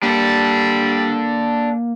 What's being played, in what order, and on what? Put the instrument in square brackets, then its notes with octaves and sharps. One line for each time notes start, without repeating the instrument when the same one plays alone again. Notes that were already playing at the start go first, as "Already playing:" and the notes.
[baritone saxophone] G3 [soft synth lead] A#3 [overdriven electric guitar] D4 A4